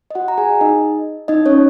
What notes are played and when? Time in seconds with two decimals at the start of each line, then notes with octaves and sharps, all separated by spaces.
0.11 D#5
0.15 F#4 F#5
0.28 A#5
0.38 G#4 G#5
0.61 D#4 D#5
1.28 D#4 D#5
1.46 C#4 C#5